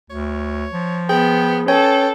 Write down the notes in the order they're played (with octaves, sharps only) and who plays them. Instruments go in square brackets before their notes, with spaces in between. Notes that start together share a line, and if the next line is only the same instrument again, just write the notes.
[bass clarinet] D2 [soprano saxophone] C#5
[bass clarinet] F3
[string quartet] B3 [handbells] G#4 [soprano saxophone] G5
[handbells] C#4 B4 C#5 [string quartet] A4 [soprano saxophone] G5